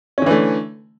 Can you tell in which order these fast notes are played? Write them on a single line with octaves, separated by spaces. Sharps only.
C#4 D3 E3 A3